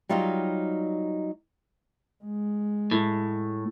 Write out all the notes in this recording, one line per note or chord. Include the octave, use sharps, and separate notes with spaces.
F#3 G3 D#4 F4 G4 F5
G#3
A2